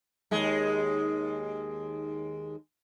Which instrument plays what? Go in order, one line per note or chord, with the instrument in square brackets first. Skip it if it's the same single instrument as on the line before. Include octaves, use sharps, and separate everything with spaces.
[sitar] D#2 G#3